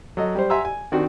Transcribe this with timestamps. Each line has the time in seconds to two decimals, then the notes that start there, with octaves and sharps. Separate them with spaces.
0.17 F#3 A4 D#5
0.35 G3 C5
0.50 E5 F#5 G#5 A#5 C6 E6
0.65 G#5
0.92 D#3 C4 D4 F#4